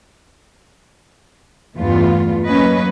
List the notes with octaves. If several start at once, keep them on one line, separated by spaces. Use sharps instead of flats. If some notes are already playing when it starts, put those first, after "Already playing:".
E2 G2 A3 B3 F4
F#3 A#3 C#4 B4 D#5